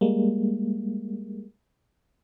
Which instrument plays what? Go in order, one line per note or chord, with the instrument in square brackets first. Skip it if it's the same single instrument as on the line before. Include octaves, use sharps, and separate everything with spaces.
[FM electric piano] G3 G#3 A#3